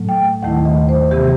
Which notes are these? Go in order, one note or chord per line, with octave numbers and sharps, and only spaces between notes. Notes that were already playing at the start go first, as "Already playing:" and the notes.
Already playing: A2 F#3 A3
G5
D#2 D#3 A3 E4 F#5
D#5
C5
C3 E3 B3 G4